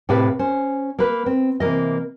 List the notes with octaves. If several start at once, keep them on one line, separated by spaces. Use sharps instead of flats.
A2 C3 G4 A4 B4 F5
C#4 C5
A#3 B4
C4
C3 E3 A#3 D#5